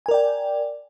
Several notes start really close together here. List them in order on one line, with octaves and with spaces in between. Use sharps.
G#5 A#4 D5 G5